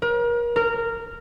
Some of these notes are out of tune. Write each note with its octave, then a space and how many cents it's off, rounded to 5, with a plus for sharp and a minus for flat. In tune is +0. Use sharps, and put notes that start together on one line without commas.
A#4 +35
A#4 -15